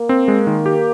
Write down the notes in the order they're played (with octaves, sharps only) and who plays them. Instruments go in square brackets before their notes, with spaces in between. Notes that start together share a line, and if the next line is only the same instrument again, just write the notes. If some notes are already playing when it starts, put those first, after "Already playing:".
Already playing: [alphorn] A#3
[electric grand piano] C4
G#3
D#3
G4